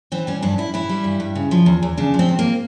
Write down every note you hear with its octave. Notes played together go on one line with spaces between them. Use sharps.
E3 C4
G3 C#4
G2 D4
G2 E4
E3 E4
G3
G2
G2
C#3
F3
E2
E2
C#3 D4
F3
C4
E2
A#3